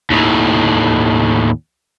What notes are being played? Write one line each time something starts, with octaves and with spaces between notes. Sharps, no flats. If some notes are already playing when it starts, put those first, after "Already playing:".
D#2 A2